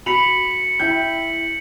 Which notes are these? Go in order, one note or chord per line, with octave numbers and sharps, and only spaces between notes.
F#4 B5 B6 C#7 F7 F#7
E4 G5 G6